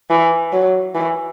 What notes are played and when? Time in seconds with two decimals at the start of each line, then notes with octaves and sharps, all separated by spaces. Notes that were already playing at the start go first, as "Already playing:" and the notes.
0.10 E3
0.53 F#3
0.95 E3